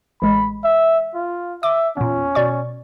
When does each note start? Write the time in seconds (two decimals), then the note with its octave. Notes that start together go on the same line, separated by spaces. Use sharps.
0.22 A1 G#3 B5
0.65 E5
1.14 F4
1.63 E5 D6
1.97 E2 A#2 C#4
2.35 B2 D5 C#6